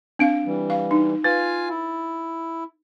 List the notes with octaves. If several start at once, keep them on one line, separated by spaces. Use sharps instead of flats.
C4 D4 F5 D7
E3 G3
F5
D#4
F4 B4 F5 G#5 A6
E4